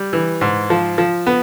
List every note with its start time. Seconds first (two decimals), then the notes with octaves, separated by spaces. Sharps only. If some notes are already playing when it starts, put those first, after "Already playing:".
Already playing: G3
0.13 E3
0.41 G#2
0.70 F3
0.98 F3
1.27 B3